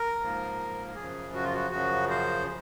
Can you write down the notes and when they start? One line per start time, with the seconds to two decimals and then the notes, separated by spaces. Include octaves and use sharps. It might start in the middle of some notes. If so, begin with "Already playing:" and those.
Already playing: A#4
0.20 G#2 F3 A#3
0.95 F#2 C#3 F3 G#4
1.34 F#4
1.43 F4
1.54 F#4
1.71 F#2 C#3 F3 F#4
2.09 C5